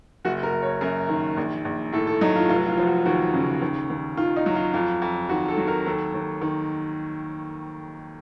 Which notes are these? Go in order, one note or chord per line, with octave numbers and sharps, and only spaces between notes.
F#1 F#4
A#4
F#1
C#5
F#2 A#4
D#3
A#1
A#1
A2 A4
A4
F#3 D#4
F4
F1 F4
F4
F3
F#4
D#2 F#4
C#3
D#2
D#2
D#3 F4
D#4
F#3
F4
F2 F4
F2
D#3 F#4
A4
F#3
A#4
D#2 A4
D#2
D#3